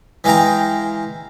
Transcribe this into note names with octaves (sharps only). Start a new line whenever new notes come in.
E3 G#3 F5 G5 A#5